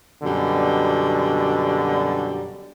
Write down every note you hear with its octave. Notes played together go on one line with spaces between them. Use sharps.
F#2 B2 D3 G3